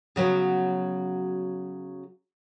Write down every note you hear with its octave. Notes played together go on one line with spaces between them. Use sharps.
C#3 F#3 B3